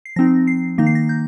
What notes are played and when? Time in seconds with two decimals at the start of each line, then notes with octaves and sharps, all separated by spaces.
0.05 C7
0.16 F3 C4 D#4 A#6
0.47 C7
0.78 D#3 A#3 D#4 A#6
0.86 C7
0.95 A#6
1.09 G6